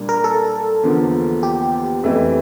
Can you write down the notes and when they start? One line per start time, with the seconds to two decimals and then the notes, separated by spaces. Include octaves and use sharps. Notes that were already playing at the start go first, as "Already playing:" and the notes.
Already playing: A#2 G3 A#3 D4
0.09 A#4
0.24 A4
0.83 E2 D3 F3 A#3
1.43 G4
2.04 F2 E3 A3 E4